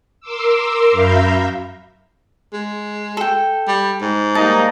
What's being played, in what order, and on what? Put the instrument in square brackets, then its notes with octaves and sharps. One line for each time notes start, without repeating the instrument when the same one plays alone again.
[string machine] A#4 C6 D6 E6
F#2 E5 F5 A#5 B5 G6
[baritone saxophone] G#3
[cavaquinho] A4 G5
[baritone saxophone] G3
G#2
[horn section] G3 A#3 D#4 [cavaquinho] A5